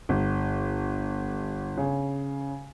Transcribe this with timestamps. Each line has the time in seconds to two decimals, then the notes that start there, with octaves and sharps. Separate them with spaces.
0.09 G1
1.77 C#3